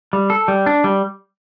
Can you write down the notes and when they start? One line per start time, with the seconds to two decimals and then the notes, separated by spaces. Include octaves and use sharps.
0.13 G3
0.30 A4
0.48 G3
0.66 D4
0.84 G3